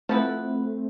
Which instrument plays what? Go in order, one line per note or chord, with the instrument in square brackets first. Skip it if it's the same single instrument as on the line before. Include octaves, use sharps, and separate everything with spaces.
[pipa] F3 B3 E4 B4 [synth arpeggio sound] A3 C4